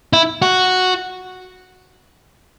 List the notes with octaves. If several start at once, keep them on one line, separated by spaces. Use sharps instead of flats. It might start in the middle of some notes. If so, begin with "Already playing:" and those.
E4
F#4